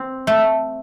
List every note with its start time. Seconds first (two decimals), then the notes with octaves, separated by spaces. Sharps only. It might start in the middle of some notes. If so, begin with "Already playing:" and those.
Already playing: C4
0.27 A3